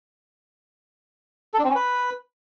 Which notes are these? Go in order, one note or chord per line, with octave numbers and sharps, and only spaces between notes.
A4
D4
C4
C#4
B4